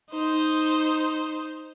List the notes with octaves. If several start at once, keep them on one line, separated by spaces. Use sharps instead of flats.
D#4 C5